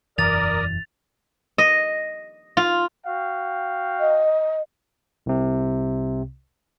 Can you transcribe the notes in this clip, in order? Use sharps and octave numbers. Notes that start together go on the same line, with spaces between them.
E1 F#2 E3 A#4 D5 D#6 A6 F7
D#5
F4
F#4 F5 G5
D#5
C2 C3